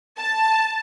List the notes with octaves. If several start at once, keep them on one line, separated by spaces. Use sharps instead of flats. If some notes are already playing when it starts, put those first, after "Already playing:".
A5